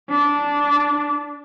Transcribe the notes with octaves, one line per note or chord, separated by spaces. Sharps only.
D4